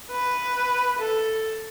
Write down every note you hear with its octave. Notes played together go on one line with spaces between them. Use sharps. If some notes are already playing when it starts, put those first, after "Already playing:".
B4
A4